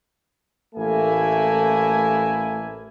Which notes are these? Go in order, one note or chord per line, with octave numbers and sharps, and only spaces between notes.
A1 A3 A#3 E4 G#5